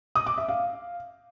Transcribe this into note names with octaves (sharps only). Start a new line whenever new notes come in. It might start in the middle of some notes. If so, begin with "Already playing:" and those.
D#6
D6
E5
F5